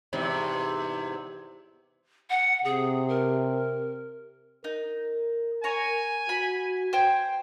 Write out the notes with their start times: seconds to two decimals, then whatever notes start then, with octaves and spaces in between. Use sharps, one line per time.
0.13 E2 G#2 C3
2.30 F#5
2.65 C3 G#4
3.08 A#4
4.64 D#4 A#4
5.64 C#5 G#5 A#5
6.29 F#4 B5
6.93 C5 G5 G#5